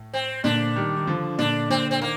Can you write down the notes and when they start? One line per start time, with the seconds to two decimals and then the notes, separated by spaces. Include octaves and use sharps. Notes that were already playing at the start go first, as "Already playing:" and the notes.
Already playing: A2
0.14 C4
0.44 A#2 D3 D4
0.76 D#3 G3
0.96 D#3
1.07 D3 F3
1.38 A#2 D3 D4
1.70 A#2 D3 C4
1.91 C4
2.01 D#3 A#3